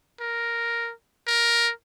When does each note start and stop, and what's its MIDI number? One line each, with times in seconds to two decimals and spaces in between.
0.20 0.92 70
1.27 1.71 70